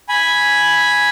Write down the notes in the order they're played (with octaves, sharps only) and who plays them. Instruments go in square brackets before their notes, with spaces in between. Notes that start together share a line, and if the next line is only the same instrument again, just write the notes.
[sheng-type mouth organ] G#5 B5